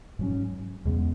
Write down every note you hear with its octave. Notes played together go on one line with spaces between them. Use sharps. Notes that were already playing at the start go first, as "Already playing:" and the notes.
G#2 F#3 C#4
E2 C#3 G#3 B3